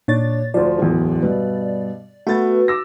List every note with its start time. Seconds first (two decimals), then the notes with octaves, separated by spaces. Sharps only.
0.08 A#2 D4 C#5 A6
0.54 D2 F3 D5
0.79 D1 E2
1.22 G2 B2 B3
2.27 A3 B3 F#4 B4 A6
2.68 D6 E6 A#6